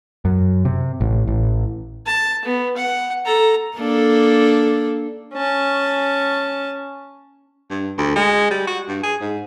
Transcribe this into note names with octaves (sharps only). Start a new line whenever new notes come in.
F#2
C3
A1
A1
A5
B3
F#5
A4 A#5
A#3 D4 A4
C#4 A5
G2
D2
G#3
G3
F#4
G2
G#4
G#2